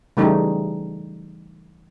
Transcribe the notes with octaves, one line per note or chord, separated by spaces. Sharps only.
C#3 E3 G3 A3 D#4